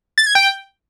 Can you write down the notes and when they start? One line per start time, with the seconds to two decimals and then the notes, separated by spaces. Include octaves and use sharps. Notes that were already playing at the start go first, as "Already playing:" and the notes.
0.18 A6
0.26 G#6
0.35 G5